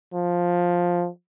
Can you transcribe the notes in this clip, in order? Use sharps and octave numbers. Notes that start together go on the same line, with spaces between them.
F3